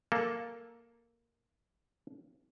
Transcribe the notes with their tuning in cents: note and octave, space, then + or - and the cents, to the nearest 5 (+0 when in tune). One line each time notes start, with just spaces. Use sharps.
A#3 +0 A4 +0